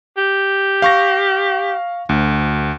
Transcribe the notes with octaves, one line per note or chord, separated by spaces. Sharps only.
G4
F5 C#6 A#6
D2